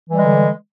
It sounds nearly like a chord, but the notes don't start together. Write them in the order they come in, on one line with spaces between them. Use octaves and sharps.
E3 G3 G#3 D3